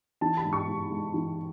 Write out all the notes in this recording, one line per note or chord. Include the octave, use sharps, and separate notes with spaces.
E3 A5
B5
G#2
C#6
G#2
G#3
E3